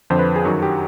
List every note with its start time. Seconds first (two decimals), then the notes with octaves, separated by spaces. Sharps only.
0.10 F2 D3 F3 C5
0.19 B4
0.36 G#4
0.45 F#2 D#3 F#3 F#4
0.62 G4